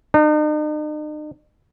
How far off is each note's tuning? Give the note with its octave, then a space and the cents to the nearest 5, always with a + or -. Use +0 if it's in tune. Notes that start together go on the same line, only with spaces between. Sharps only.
D#4 -45